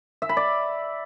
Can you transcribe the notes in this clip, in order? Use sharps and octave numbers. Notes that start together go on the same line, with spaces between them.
E5
B5
D5